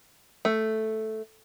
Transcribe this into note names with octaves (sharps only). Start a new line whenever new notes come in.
A3